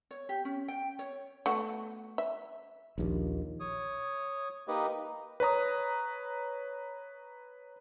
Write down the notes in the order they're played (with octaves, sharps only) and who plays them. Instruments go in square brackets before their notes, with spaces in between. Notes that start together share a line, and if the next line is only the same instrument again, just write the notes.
[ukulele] C#5
G4
C#4
G5
C#5
[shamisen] A3 B3 F#4
E5
[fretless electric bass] A#1 D#2
[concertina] C#5 D#6
A#3 D#4 G4 B4 D#5
[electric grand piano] B4 C#5 A#5 D#6